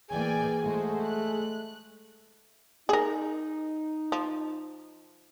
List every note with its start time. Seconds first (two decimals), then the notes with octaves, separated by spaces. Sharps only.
0.10 E3 A#3 G#4 D5 G5 G#5
0.64 G#3 A3 F#4 C5
1.04 F#6
2.89 D#4 G#4 A#4
4.12 F3